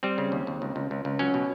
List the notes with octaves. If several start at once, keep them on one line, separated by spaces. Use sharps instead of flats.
G3 C4
C#3
D#2
D#2
C#2
C#2
C#2
C#2
F#3 C#4
B2